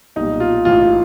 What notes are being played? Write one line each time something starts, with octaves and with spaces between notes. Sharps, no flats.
B1 A#2 G3 D#4
F4
A1 G#2 E3 F4